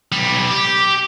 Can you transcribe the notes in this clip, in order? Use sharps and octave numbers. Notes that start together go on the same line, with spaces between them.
B1 G3
G4